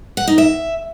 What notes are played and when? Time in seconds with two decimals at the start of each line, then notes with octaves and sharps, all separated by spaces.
0.17 F#5
0.27 D#4
0.38 E5